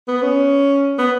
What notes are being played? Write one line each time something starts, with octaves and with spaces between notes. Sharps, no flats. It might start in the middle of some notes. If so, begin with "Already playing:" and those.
B3
C#4
B3